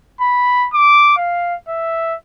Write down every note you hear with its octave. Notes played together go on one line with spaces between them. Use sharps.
B5
D6
F5
E5